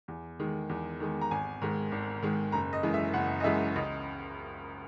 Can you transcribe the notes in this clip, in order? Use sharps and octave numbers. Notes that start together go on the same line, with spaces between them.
E2
D#3 G#3
E2
D#3 G#3
A#5
G#1 G#5
G#2 D#3 G#3
G#1
G#2 D#3 G#3
F#1 A#5
D#5
F#2 E3 G#3
E5
F#1 F#5
D#5
F#2 E3 G#3 E5
C#2 D#5